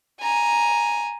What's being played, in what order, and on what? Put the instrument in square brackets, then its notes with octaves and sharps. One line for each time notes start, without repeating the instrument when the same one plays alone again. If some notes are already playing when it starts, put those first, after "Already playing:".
[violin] G#5 A#5